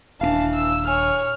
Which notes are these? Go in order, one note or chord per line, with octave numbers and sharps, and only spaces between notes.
D#1 E3 C4 D4 F5 A5
E6
C#5 G#5 F6